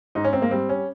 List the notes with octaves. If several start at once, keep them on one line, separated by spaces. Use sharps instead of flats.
G#2 D#4
C#4
G#2 C4
A#3
G3 C4
C#4